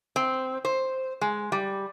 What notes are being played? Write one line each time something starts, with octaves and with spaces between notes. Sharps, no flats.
C4
C5
G#3
G3